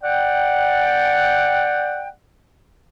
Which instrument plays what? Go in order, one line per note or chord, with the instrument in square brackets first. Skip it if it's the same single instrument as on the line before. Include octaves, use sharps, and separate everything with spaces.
[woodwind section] D5 F#5 G5